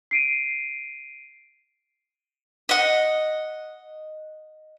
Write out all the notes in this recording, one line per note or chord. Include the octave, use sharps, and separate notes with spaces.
C7 D7 D#7
D#5 F#5